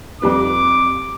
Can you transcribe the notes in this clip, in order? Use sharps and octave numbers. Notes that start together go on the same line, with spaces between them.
F2 G3 B4 D6